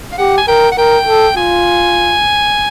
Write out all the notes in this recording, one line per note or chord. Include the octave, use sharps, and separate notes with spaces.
F5
G4 F#5
G#5
A#4 G5
F#5
A#4 G5
A4
F4 G#5